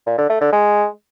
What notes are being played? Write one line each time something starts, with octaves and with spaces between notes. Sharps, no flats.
A#2
D3
A3
D3
G#3